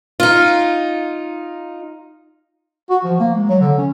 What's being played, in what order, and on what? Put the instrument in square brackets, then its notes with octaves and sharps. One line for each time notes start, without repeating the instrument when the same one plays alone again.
[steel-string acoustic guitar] D#4 F4
[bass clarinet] F#4
F3
A#3
G#3
F#3
D3
C#4